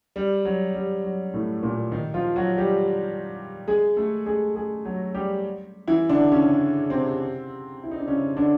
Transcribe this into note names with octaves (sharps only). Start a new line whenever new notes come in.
G3
F#3
G3
F#3
A2 A3
A#2 A#3
D#3 D#4
F3 F4
F#3 F#4
G3 G4
G#3 G#4
A3 A4
G#3 G#4
G#3 G#4
F#3 F#4
G3 G4
E3 E4
D3 D4
C#3 C#4
C3 C4
E4
D#4
D4
C#3 C#4
D3 D4